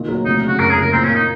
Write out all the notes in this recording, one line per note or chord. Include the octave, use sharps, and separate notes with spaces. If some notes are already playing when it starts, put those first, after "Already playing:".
Already playing: A#2 D#3
F#3
F1 D#4
C#3 F#4
F#2 A#4
G#4
F#1 A#4
A#2 C4
C#4
A#3
D#4